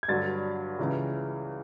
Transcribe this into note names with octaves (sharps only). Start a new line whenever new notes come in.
G#6
G2 D3 F#3 A6
C#2 C#3 E3